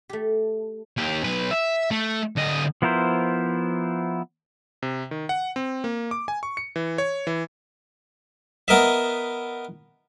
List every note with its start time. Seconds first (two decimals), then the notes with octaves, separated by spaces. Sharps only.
0.09 A3 G4
0.97 D#2 G4
1.24 B1 B4
1.51 E5
1.91 A3
2.37 D2 D#5
2.82 F3 B3 E4 A#4 C5
4.83 C3
5.11 D#3
5.29 F#5
5.56 C4
5.84 A#3
6.11 D6
6.28 G#5
6.43 C#6
6.57 C#7
6.76 E3
6.98 C#5
7.27 E3
8.68 B3 A#4 D#5 E5